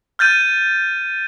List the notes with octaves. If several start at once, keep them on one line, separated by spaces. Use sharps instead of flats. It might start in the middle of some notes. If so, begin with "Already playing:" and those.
F6 G6 A6 D#7